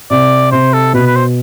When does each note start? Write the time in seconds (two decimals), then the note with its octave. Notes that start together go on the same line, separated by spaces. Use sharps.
0.10 C3 D5
0.52 C3 C5
0.73 A4
0.94 B2 B4
1.06 B4
1.16 C5